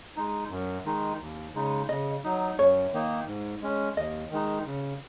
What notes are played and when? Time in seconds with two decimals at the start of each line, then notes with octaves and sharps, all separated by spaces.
0.17 G#3 D#4
0.51 F#2
0.85 D#3 G#3 D#4
1.21 D#2
1.55 C#3 G#3 D#4
1.89 C#3 D#5
2.24 F#3 D#4
2.59 F#2 C#5
2.93 D#3 A#3 D#4
3.27 G#2
3.62 G#3 C#4
3.97 D#2 D#5
4.31 D#3 G#3 D#4
4.66 C#3